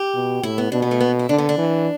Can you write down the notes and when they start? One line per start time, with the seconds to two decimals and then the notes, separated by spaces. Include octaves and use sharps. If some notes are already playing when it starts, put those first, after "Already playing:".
Already playing: G4
0.15 B2
0.43 A2 E4
0.58 B3
0.72 B2 D4
0.82 B3
0.91 A3
1.01 B3
1.19 E4
1.29 D3 D4
1.38 B3
1.49 D4
1.58 E3